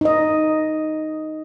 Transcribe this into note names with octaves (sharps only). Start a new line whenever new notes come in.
D#4 D#5